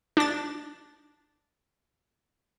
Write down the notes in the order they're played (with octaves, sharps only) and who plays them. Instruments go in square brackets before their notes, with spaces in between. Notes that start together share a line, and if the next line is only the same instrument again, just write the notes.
[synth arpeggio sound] D4 A6